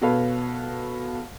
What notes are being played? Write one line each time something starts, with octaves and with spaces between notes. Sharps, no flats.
B2 A4 B4 C#5 F5